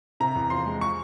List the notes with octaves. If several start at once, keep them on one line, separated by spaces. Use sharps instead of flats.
C3 A#5
E2
F3 C6
G#3
C#6